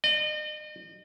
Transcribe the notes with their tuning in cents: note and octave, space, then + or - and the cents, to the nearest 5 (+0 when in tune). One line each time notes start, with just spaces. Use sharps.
D#5 -40